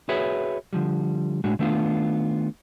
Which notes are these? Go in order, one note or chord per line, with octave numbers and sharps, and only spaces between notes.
F#4 G#4 B4 C#5 E5
D3 F3 G3
A2 G#3 D4 F#4
D#3 A3 B3 D4 F4